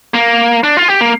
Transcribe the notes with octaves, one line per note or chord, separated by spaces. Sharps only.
A#3
D4
F4
G4
A#3